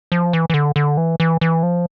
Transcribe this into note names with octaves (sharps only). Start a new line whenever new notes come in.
F3
E3
E3
D3
D3
E3
E3
E3
F3